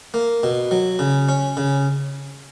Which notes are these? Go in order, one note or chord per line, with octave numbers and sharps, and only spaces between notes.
A#3
B2
F#3
C#3
C#4
C#3